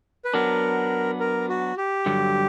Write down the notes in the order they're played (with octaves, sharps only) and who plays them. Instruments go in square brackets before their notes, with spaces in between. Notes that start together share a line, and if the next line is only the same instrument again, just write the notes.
[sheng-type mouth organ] B4
[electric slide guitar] F#3 B3 D4 [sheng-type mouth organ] A#4
[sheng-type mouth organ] A#4
F#4
G4
[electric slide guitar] G2 D3 F#3